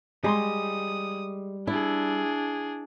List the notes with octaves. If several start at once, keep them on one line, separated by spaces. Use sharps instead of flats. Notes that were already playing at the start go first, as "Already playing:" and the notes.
G3 G#3 B5 C6 D#6
D4 E4 G#4